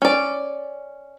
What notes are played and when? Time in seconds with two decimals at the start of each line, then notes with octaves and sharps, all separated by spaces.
0.02 C#4 D5